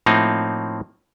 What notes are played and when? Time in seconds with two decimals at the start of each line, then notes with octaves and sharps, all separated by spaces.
0.06 A2 F3 A#3 C4 D#4